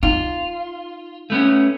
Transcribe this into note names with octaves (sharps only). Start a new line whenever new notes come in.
D#4 F4
A3 B3 C#4